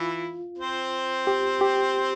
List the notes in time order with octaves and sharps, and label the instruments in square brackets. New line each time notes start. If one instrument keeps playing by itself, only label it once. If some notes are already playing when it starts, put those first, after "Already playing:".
Already playing: [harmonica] E3 E4 [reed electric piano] F4
[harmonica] C4 C5
[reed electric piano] G4
G4